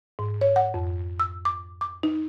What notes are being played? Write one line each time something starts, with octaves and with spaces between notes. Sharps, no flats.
G#2
C#5
F#5
F2
E6
D6
D6
D#4